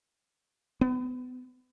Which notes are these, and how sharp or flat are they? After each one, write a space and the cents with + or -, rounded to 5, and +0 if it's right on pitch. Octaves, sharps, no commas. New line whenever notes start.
B3 +30